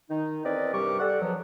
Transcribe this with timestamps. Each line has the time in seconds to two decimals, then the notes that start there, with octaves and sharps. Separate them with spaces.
0.10 D#3 D#4
0.45 E2 C4 A#4 B4 D5 D#5
0.74 G2 C3 G3 A#4 C#6 D6
1.00 G3 A4 F#5
1.21 E2 F3 F#3